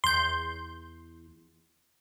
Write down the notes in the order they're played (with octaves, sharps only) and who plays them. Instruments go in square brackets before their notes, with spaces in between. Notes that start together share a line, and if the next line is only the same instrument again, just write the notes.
[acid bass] E2 [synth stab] C6 G6